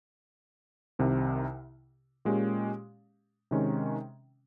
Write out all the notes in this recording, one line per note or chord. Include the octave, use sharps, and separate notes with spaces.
C2 C3 D#3
A#2 G#3 C#4 G4
C3 D#3 G#3 C#4